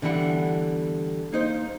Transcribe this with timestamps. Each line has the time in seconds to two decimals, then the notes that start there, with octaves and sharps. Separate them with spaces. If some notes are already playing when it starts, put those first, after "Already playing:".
0.02 D3 E3 G3 B3 F#5
1.32 A#3 D#4 C5